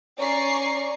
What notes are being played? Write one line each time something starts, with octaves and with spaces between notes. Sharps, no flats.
C#4 D5 A#5 C#6 C7